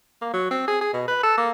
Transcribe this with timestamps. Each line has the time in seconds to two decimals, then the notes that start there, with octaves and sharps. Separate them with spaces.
0.22 A#3
0.34 F#3
0.51 C4
0.68 G#4
0.81 G#4
0.94 B2
1.08 B4
1.23 A4
1.38 A#3